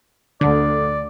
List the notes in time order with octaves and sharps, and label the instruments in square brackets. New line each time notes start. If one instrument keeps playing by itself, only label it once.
[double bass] D2 [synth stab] D3 [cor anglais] D5